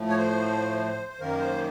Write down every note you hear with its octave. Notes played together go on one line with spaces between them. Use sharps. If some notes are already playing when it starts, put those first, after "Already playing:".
Already playing: A2 F3 A3
C#5
C5
C5
F#2 D#3 A#3 A#4
C5